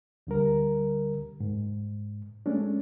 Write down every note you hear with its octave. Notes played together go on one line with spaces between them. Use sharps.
D2 D3 G3 A#4
G#2
G#3 A3 C#4 D4